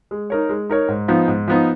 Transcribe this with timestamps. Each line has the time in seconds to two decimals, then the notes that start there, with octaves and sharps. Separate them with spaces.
0.11 G#3
0.30 D#4 A#4 C#5
0.49 G#3
0.70 D#4 A#4 C#5
0.88 G#2
1.08 F3 B3 D#4
1.28 G#2
1.48 F3 B3 D#4